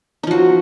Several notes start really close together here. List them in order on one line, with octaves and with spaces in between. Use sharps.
D#4 F3 F#4